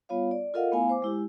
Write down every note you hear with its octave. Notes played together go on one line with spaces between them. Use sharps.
G3 B3 F4 C#5 F5
D5
F4 A4 A#4 D#5 F5 F#5
A3 B3 E4 F5 G#5
C5 D6
G#3 E4 G4